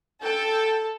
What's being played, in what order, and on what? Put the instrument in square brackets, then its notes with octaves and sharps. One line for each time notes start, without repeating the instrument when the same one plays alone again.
[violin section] A4 [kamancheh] G5